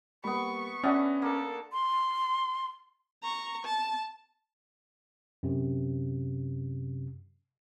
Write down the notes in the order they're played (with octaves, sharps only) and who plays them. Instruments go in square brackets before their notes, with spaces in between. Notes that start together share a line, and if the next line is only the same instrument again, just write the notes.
[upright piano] G3 A#3 [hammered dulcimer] B3 B5 [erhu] C#6
[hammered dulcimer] B3 D4 F#4 [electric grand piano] C#4 [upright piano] E5 A5 D6
[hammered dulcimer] A#3 [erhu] A4
[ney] C6
[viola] A#5 C#6
A5
[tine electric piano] F#2 C3